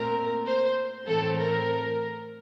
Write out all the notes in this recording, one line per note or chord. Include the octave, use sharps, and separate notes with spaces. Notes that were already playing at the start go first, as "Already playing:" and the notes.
Already playing: A#2 A3 C4 A#4
C5
A2 E3 A3 C4 A4
A#4